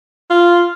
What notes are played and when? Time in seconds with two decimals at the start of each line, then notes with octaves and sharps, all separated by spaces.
0.30 F4